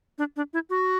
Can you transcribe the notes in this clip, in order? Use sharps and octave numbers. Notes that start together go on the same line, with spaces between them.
D4
D4
E4
F#4